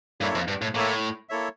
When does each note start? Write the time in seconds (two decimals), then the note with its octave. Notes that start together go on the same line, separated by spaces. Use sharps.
0.21 G2 A#3 E4 A4 C#5 E5
0.35 F2
0.48 G2
0.62 A2
0.75 A2 A#3 E4 A4 C#5 E5
1.29 A#3 E4 A4 C#5 E5